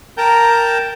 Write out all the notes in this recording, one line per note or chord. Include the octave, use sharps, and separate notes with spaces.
A#4 G5 A5 A#5 G6